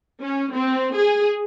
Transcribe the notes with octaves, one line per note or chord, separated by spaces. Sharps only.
C#4
C4
G#4